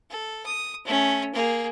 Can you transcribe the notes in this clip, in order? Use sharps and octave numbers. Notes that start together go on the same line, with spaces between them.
A4
D#6
A3 C#4
A#3 G#4